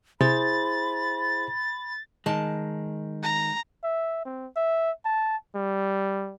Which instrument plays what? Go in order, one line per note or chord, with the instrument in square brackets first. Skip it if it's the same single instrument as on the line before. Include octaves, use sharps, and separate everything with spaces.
[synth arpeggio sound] C3 [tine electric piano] E4 G#4 C5 [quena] B5 [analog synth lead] A6
[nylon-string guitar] D#3 A5 [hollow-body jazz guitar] G#3
[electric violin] A#5
[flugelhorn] E5
C4
E5
A5
G3